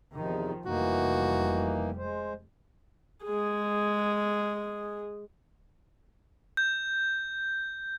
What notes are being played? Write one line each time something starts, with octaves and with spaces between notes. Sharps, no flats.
E2 C3 D#3 F3 D#4
F1 F2 E3 G3 A#3 D#4 F#4
G#3 C5
G#3 G#4
G6